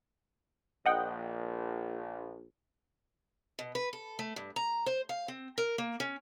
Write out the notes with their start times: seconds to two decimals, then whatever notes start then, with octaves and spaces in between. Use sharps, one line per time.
0.86 A#1 D#5 F#5 G5
3.59 B2
3.75 B4
3.93 A4
4.19 A3
4.36 G2
4.56 A#5
4.86 C5
5.09 F5
5.28 C4
5.58 A#4
5.78 A#3
6.00 C#4